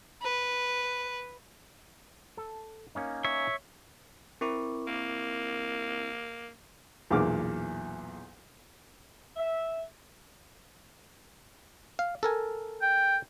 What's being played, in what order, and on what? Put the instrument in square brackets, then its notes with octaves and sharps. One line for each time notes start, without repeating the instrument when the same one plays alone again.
[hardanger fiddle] B4
[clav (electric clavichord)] A4
A#3 C#4 D#4
[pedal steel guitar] C#5 E5
[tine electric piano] C4 E4 [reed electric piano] A#4 C#6 D6
[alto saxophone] A#3
[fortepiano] B1 E2 A#2 G#4 D6 F6
[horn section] E5
[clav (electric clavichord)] F5
A4 A#4 G#5
[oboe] G5